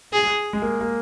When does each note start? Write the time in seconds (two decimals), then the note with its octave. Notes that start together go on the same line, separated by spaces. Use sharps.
0.13 G#4
0.53 G#3
0.62 A#3
0.81 A#3